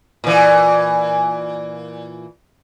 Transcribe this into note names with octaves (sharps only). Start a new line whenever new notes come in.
A#2 E3